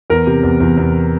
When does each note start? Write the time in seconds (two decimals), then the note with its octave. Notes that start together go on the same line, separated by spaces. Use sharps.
0.10 E2 A#4
0.27 C3
0.43 E2
0.60 E2
0.77 E2